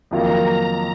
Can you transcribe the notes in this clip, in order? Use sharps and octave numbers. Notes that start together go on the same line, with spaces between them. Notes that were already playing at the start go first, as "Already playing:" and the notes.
F2 D#3 F#3 A#3 F4 A#5